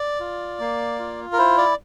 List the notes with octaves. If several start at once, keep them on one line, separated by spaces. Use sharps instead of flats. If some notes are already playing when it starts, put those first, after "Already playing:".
Already playing: D5
F4
A#3
F4
A#4
E4 C5
D5